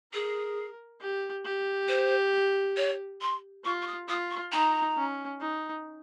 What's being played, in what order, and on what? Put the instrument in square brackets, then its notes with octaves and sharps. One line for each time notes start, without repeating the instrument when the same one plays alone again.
[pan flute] G#4 [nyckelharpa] A#4
[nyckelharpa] G4
G4
[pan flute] C5
C#5
C6
[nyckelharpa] F4 [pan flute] C#6
[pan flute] C#6
D#6
[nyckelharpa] F4 [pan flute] D#6
[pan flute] C#6
[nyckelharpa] D#4 [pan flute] A#5
[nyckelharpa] C#4
D#4